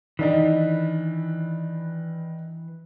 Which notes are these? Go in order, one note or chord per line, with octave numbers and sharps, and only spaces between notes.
D#3 E3 D4 D#4